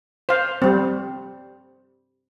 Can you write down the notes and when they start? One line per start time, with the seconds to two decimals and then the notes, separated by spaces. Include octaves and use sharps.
0.29 C5 F5
0.62 G3 C4